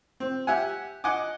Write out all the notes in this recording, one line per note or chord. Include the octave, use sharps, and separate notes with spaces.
C4
G4 E5 F#5 G#5
D#5 F#5 G#5 D6